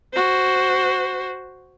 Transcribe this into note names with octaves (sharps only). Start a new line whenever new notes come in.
F#4 C5